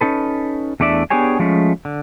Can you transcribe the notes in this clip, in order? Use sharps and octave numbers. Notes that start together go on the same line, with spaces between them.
C#4 D#4 A4 B4
E2 A3 D4 D5 E5
B3 D4 G4 G#4 C#5 G#5
F3 G#3 A3 C#4
D3